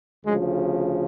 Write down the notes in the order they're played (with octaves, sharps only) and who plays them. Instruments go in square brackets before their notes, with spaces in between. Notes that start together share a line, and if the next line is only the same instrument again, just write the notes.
[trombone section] D2 C#3 F3 G#3